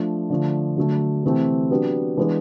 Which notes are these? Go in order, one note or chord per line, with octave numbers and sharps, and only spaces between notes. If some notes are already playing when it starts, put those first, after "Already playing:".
Already playing: F3 A3 D4
D3 F3 A3
D3 F#3 A3
C3 E3 A3 C4
F#3 B3 D4 G4
E3 G#3 B3 D4